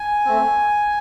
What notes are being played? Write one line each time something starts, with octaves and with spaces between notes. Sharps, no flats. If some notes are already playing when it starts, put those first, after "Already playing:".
Already playing: G#5
A3 C4